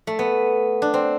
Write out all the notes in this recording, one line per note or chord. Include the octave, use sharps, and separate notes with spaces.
A3
B3
D4
C4